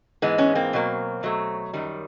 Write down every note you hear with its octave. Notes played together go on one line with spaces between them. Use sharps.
G#2 E3 G#3 B3
B3 C#4
A#3 C4
B2 F#3 A#3
B2 F#3 A3
F#2 D#3 G3